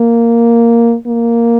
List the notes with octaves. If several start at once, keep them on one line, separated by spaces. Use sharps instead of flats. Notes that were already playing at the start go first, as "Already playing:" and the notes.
Already playing: A#3
A#3